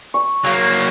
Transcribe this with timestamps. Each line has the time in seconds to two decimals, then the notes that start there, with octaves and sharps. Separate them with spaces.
0.14 C#6
0.45 F#3 A#3